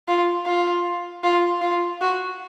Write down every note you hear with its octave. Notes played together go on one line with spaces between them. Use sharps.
F4
F4
F4
F4
F#4